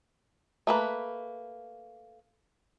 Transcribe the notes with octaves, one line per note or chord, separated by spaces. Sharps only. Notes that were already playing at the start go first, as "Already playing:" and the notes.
A3 A#3 B4